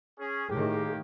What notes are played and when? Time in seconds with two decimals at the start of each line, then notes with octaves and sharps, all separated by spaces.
0.19 C#4 G#4
0.50 A2 D#3 A#3 G4 G#4